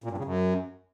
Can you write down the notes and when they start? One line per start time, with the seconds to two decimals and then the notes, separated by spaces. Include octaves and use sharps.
0.04 A#2
0.11 G2
0.18 C#3
0.24 F#2